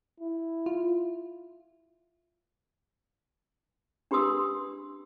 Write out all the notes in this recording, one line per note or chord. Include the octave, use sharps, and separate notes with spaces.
E4
F4
D4 G4 B4 C6 D#6 E6